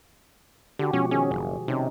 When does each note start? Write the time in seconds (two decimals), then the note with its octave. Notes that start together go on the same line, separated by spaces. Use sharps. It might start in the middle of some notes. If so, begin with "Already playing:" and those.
0.79 D3 F#4 G4
0.93 B2 F3 G#3 C#4
1.11 D#3 C#4 G#4
1.31 F#1
1.68 C3 C#4 D#4